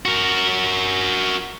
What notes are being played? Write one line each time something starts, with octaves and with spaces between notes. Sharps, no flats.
F#4 A#4